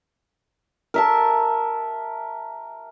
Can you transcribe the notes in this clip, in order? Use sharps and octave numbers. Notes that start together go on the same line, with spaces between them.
A#4 E5 A5